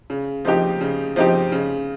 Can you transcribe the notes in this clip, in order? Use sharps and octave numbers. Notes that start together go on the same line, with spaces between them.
C#3
F3 C4 D#4 G4
C#3
F3 C4 D#4 G4
C#3